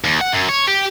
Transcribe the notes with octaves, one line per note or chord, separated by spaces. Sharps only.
D#2
F#5
F#2
C#5
G4